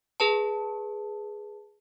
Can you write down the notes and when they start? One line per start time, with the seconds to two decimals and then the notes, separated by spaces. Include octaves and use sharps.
0.20 G#4 B4 A5